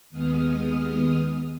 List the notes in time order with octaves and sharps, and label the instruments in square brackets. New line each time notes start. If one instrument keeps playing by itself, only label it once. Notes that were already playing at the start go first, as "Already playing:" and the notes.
[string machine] D#2 G#3 B3 D#6 F6